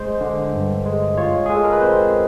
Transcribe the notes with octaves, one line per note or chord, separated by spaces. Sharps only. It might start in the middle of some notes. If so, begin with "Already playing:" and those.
Already playing: G#3 C5
D3
G2
G#3
F4 C#5
G#4
G#3
A4
A#4
B4
C4 C5